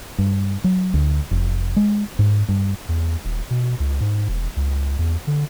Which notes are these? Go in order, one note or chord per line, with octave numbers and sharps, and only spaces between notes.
G2
F#3
D2
F1
G#3
G#2
G2
E2
D#1
B2
C#2
G#2
E1
C#2
E2
D3